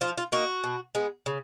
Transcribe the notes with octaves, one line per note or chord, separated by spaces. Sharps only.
F3 F4
F4
A#3 D#4 F#4
B2
G#3 B3
C#3